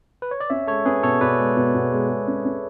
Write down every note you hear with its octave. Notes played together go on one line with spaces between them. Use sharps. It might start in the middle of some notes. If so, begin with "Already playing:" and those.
B4
C#5
D5
C#4 C#5 E5
G#3 A4 C#5
C#4 G#4 B4
B2 A4 C#5
B2 B4 D5
G#3
B2
B2
G#3
G#3
C#4
C#4